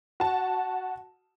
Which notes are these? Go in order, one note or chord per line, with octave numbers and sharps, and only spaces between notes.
F#4 A5